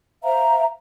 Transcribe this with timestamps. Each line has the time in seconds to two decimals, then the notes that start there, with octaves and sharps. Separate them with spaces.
0.23 C5 E5 F5 A#5